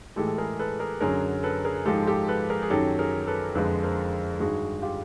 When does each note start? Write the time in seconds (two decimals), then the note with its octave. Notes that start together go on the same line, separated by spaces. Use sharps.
0.16 A2 E3 G#3 G4 A4
0.27 A4
0.38 G#4 A#4
0.59 A4 B4
0.80 G#4 A#4
1.01 F#2 D3 F#3 G#4 A#4
1.43 A4 B4
1.65 G#4 A#4
1.85 G#2 F3 G#3 G4 A4
2.07 G4 A4
2.28 A4 B4
2.50 G#4 A#4
2.63 G#4
2.70 F#2 D#3 F#3 G4 A4
2.99 G#4 A#4
3.27 A4 B4
3.55 F2 D3 F3 G#3 A4 B4
3.83 A#4 C5
4.40 G2 D#3 G#3 F#4 G#4
4.82 F4 G4